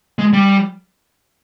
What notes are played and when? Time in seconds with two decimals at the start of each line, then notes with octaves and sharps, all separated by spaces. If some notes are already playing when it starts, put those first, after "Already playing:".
0.19 G#3
0.33 G3